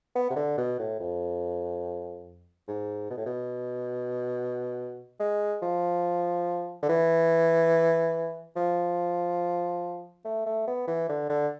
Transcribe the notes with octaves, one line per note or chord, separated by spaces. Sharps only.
B3
C3
D3
B2
A2
F2
G#2
B2
A2
B2
G#3
F3
D3
E3
F3
A3
A3
B3
E3
D3
D3